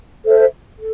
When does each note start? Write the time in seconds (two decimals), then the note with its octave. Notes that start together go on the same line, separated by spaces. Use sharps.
0.24 A4 C5 E5
0.79 A4